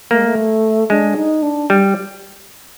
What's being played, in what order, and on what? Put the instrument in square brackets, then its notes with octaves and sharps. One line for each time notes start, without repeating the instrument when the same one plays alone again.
[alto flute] A3 [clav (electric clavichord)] A#3
[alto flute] G#3
A3
[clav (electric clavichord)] G#3 [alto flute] D4
[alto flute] D#4
D4
[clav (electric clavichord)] G3